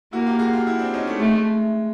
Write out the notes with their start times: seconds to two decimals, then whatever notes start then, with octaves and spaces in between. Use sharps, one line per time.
0.13 A#3 E4 F#4
0.26 F4 G4
0.39 F#4 G#4
0.52 F4 G4
0.67 E4 F#4
0.79 C4 D4
0.94 C#4 D#4
1.07 A3
1.20 G#3 A3